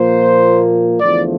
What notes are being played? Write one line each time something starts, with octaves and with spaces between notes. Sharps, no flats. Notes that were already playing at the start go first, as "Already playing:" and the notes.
Already playing: A#2 F3 A#3 C5
E2 D3 F3 A3 D5